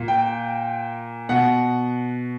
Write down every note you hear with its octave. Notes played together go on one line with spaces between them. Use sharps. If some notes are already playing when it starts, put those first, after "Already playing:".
Already playing: A#2
G5
B2 F#5